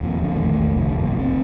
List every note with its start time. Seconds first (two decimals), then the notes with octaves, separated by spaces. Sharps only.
0.01 D#1 F2 A#2
0.23 A1 F2 D3
0.36 A#1 E2 D#3 A3
0.76 F1 C2 F2 D3
0.98 F#1 B1 A#2
1.17 F1 C4